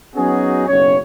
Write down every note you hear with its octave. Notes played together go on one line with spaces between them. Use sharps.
F#3 B3 C#4 D#4 F#4 G#4
F#1 B1 C#4 C#5